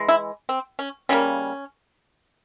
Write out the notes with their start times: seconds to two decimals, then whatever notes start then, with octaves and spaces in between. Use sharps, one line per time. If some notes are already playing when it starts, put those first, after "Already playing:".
Already playing: E3 G#3
0.08 E4
0.49 C4
0.79 C#4
1.09 C#3 G3 A#3 C#4